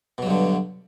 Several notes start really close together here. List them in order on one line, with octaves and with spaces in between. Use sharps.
B2 F#3 G2 D3